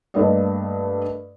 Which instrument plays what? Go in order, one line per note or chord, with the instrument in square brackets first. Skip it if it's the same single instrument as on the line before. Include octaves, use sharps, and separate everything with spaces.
[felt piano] G2 A3 A#3 D5 D#5